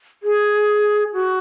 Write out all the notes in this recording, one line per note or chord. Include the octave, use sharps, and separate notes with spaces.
G#4
F#4